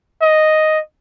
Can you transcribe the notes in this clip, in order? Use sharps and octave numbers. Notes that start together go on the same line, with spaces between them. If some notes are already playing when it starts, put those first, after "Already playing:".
D#5